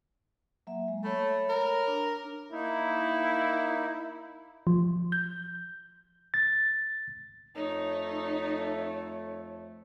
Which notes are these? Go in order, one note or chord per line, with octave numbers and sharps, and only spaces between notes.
F#3 A#3 E5
G#3
A3 C#5 B5
A#4
D4
A#3 D#4 E4
F3
G6
A6
F2 A3 D#4 C#5